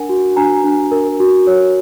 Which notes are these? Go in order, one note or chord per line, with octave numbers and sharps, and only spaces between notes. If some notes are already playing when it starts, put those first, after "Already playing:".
Already playing: D4 A#4 F#5 G#5
F#4
D4 G#5 A#5
D4
A#4
F#4
C#5